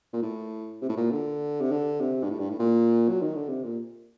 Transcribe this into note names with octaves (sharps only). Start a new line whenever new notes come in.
A#2
A2
C3
A2
A#2
D3
C3
D3
C3
G2
A2
G2
A2
A#2
F#3
D#3
D3
C3
A#2